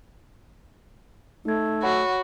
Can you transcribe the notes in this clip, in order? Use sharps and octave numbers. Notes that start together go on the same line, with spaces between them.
A3 D#4 G#6
F#4 C#5 F#5 B5